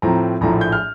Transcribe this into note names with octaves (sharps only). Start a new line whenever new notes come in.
A2 F3 C4 A#5
A#1 A2 F3 A#5
G6
F6